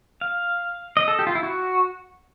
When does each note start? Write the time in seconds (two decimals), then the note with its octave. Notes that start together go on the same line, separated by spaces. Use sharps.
0.21 F5
0.97 D#5
1.08 A4
1.19 G4
1.27 F4
1.35 E4
1.43 F#4